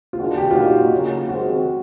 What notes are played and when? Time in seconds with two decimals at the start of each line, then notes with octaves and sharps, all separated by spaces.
0.13 F4
0.19 D#3 G#3 B3 D4 F#4
0.37 G4
0.51 F4
0.55 A#2 F#3 A#3 D#4 F#4
0.92 C#3 F#3 A#3 C#4
1.28 D#3 G#3 C4 F#4